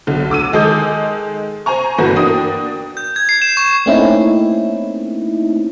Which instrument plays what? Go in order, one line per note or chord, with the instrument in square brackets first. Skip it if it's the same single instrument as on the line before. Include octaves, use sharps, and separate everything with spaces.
[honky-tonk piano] B1 D3
D2 D6 E6 D#7
D#3 G#3 G#4 A4 D#6 G6
C5 G#5 A#5 C#6
G1 E3 A3 F#4 B4 A#6
A#3 D4 F#4 G5 D#6
[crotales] G6
G#6
C7
E7
C#6
[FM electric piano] A3 A#3 C4 C#4 D#4 E4